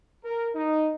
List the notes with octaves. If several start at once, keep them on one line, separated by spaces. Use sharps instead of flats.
A#4
D#4